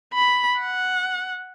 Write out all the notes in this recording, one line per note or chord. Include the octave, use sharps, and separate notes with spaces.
B5
F#5